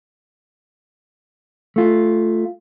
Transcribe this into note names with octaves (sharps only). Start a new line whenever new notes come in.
A3 F4